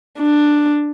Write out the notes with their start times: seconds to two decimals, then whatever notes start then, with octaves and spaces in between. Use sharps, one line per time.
0.19 D4